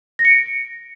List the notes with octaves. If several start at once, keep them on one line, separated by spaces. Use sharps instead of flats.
A#6
C#7
D7